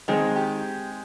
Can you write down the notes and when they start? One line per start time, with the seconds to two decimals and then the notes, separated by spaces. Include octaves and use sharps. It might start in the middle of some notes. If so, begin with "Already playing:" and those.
0.08 D#3 G#3 C4
0.36 G4